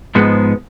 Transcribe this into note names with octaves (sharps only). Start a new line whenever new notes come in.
G#2 F3 G#3 B3